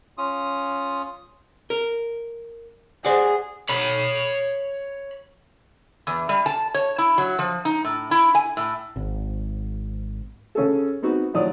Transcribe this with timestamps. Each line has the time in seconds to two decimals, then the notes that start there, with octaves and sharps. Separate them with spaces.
0.18 C#4 F4 D#6
1.70 A#4
3.05 G#4 C5 D5 F#5
3.69 C#5 B5
6.07 E2
6.29 G3
6.46 A5
6.74 C#5
6.98 E4
7.18 F#3
7.39 F3
7.65 D#4
7.85 A2
8.11 E4
8.35 G#5
8.57 A2
8.96 G#1
10.55 C#3 C#4 G#4 A4
11.02 B3 C4 D#4 F#4
11.34 D#2 A2 F3 F#3 D5 D#6